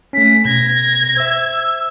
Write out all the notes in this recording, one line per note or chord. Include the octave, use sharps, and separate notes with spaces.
A3 C#4 B6
B2 G#6 A#6
C5 E5 E6